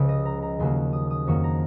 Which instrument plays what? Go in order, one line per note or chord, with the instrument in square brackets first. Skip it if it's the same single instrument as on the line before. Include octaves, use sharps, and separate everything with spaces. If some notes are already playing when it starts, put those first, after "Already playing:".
Already playing: [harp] C#2 C#3 F3 G#3
D#5
A#5
A#5
D#2 C#3 F#3 A#3 C6
D#6
D#6
F2 D#3 F#3 A#3 C#6
A#5